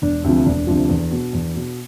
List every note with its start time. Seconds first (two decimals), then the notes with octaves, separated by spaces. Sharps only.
0.02 E1 D4
0.24 D2 C3 F3 C4
0.46 E1 D4
0.67 D2 C3 F3
0.89 E2
1.11 B2
1.33 E2
1.55 B2